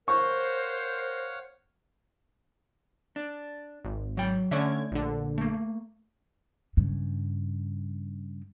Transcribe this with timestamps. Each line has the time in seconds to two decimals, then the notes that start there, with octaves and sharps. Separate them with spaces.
0.08 A#4 C5 C#5 F5 F#5 C#6
3.16 D4
3.84 G#1
4.17 F#3 G5
4.51 D3 A3 C#4 D5 E5 G#6
4.92 A#1 D3
5.38 A3 A#3
6.77 G2 C#3